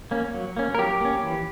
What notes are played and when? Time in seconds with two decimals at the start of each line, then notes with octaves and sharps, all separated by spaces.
0.11 A#3 C#4
0.34 F#3
0.57 A#3 C#4
0.75 A#4
0.79 F#3 G4
1.01 A#3 C#4
1.23 E3